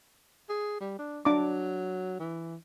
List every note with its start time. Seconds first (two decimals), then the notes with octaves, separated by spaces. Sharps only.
0.49 G#4
0.80 G3
0.99 D4
1.25 F#3 D4 D6
2.20 E3